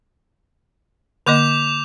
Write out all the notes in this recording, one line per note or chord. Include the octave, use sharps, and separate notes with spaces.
D3 A#3 D#5 D6 G6 F7